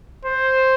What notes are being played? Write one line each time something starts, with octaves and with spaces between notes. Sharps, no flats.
C5